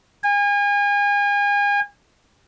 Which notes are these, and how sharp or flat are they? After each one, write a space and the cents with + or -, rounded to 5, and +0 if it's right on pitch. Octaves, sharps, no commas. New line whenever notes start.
G#5 -35